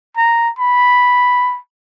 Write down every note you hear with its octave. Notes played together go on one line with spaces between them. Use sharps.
A#5
B5